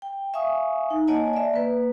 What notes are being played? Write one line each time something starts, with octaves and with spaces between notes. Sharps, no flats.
G5
E5 F5 G#5 C#6 D#6
D#4
A#3 C#5 D#5 F#5 G#5 A5
D5 E5
A#3 B4